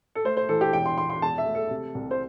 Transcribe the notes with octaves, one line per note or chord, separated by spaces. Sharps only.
A4
A3 C5
C5
E3 A4
G4
E1 G5
C6
E1 C6
C6
E2 A5
E5
A3
A4
C3
C2
C5